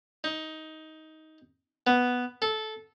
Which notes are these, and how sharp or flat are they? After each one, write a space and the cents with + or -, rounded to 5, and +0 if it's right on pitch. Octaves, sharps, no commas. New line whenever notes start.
D#4 +15
B3 +0
A4 -15